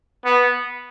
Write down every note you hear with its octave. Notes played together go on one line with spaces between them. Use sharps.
B3